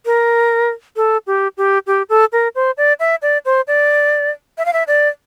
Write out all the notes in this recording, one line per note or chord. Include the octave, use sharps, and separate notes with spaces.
A#4
A4
G4
G4
G4
A4
A#4
C5
D5
E5
D5
C5
D5
E5
F5
E5
D5